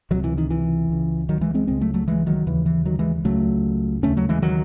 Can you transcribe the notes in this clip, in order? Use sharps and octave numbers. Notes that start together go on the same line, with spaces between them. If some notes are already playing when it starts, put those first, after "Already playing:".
C#2 C3 D#3 F#3
E3
D#3
E3
C#2 C#3
D#3 F#3
E3 G#3
G#3 C4
C#2 C#3 G#3 C4
F#3 A3
F#3 A3
E3 G#3
D#3 F#3
D#2 C#3 E3
E3
D#3 F#3
E3 G#3
C#2 C#3 F#3 A3
D#2 C#3 A3 C#4
F#3 A3
E3 G#3
D#3 F#3